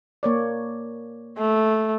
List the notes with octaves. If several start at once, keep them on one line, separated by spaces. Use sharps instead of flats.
A#3 C#5 D5
A3